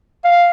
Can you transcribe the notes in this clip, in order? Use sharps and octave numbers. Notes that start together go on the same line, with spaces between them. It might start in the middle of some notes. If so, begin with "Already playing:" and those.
F5